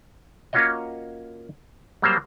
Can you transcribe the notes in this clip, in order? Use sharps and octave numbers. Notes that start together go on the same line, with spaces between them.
A#3 C#4 F4 F#4 C#5 D#5
F#3 G3 A#3 C5 F5